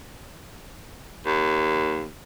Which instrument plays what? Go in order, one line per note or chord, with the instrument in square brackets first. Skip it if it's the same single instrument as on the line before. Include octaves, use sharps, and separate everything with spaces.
[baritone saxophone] D#2